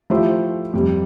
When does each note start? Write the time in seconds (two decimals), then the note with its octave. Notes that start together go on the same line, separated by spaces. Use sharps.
0.10 F3 A3 E4 G4 C5
0.74 F2 C3 G3